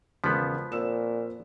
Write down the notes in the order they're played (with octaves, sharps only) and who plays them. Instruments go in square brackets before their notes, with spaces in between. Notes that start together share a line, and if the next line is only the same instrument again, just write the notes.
[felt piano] E1 C#3 B6 [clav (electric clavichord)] F3 B3
[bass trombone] A#2 [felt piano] C4 E6 E7